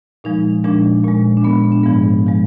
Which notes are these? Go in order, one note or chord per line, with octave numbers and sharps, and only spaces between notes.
A#2 F3 G#3 D#4
A#2 F3 G#3 D4
A#2 G#3
D4
A#2 G#3 B3
D4
G#2 F3 G#3 B3
F3 G#3